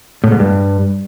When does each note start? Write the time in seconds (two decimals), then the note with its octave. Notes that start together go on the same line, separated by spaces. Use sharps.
0.24 A2
0.31 G#2
0.39 G2